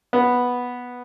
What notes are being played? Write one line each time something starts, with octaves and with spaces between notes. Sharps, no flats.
B3